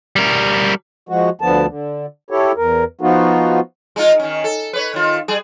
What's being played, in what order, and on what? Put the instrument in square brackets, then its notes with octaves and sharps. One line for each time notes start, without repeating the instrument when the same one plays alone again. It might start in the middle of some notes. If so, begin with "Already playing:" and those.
[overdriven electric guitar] G3 A#4
[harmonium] F3 G#3 F#4
D2 D3 F3 B3 A5
D3
E4 G4 A4 C#5
E2 A#4
F3 B3 D#4 F4 F#4
[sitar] G#3 D#4 F4
D#3 C#4
A4
B4 C#5
D#3 F4
G3 G#4